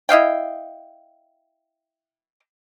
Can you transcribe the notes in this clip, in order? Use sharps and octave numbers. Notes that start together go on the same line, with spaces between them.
E4 D#5 F5 G5